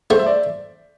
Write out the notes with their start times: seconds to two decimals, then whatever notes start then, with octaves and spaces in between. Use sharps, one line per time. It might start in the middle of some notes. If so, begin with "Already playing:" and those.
0.10 A3 C5
0.19 E5
0.26 D5